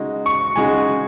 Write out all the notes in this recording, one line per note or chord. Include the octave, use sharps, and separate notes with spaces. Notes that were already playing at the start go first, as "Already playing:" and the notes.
Already playing: C#3 G#3 D#4 F#4
C#6
C#3 G#3 D#4 F#4 G#5